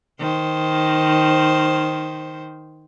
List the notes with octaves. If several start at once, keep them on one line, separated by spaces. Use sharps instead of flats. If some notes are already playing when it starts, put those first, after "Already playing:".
D#3 C5